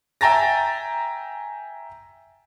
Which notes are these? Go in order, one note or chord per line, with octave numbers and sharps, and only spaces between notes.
E5 G5 G#5 A#5 A6 A#6